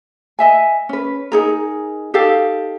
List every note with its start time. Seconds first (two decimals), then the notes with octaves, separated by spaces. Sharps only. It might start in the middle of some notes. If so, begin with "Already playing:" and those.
0.39 D#5 E5 G#5
0.89 C#4 B4
1.32 D#4 G#4 A#4
2.14 D#4 G4 A4 F5